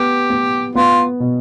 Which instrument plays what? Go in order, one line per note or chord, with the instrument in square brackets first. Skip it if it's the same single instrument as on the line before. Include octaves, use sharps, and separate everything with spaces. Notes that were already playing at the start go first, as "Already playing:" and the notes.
Already playing: [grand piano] B3 [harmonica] G4
[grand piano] B3
[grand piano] B3 [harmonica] F4
[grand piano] B2